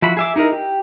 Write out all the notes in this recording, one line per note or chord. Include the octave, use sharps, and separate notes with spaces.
F3 E4 F#4 B5
G#4 E5 D6
D#4 E4 G#4 A#4 D#5
G4